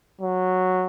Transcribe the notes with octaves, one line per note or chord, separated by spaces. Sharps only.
F#3